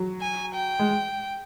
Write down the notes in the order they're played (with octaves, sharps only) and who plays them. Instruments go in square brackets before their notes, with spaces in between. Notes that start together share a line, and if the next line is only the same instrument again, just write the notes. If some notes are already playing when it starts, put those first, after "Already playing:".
Already playing: [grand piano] F#3
[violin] G#5
G5
[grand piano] G#3